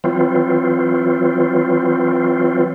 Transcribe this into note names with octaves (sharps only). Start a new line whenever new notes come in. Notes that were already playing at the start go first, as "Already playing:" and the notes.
E3 F#3 C4 F4